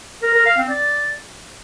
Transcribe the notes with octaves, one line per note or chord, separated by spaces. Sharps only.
A#4
A#4
F5
C4
D5